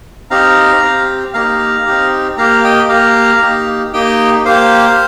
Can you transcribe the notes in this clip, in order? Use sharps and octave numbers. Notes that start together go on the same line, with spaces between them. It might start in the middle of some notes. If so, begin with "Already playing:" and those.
C4 D#4 G4 F5 A#5
C4 G4
A#3 D#4 G4 F5 A#5
C4 D#4 G4
A#3 G4 F5 A#5
D#5 G5
A#3 G4 F5 A#5
A#3 D#4 G4
A#3 D#4 G4 D#5 G5
A#3 G4 C5 F5